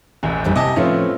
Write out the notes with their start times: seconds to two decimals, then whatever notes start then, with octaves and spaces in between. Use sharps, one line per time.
0.23 E1 A1 E2
0.44 F2 D#3 G3
0.56 C3 E4 D#5 G#5 A5
0.76 A2 F3 A3 C4 C#4 F4 B4